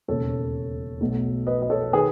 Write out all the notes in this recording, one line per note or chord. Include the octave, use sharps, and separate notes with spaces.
E1 D#2 C#3 A4 C#5
B1 B2 A3
B4 D#5
D#5
A4 C#5
D#3 G#4 B4